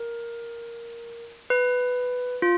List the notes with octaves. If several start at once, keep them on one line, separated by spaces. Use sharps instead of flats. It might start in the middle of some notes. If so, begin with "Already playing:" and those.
Already playing: A#4
B4
F4